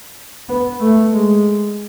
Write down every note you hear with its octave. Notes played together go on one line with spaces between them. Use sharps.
B3
A3
G#3